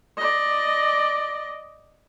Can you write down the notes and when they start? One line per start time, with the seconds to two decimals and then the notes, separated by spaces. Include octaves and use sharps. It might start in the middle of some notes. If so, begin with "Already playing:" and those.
0.18 D5 D#5